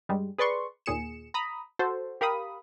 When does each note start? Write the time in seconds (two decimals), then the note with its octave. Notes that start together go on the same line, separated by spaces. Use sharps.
0.09 G2 G3 G#3
0.38 G#4 B4 D5 C6 C#6
0.86 D#2 A#2 G#4 C#7 E7
1.34 A#5 B5 D#6
1.79 F#4 A4 C5
2.21 G4 A#4 F5 B5 D#6